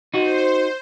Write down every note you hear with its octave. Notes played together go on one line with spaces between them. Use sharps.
D#4 F#4 C5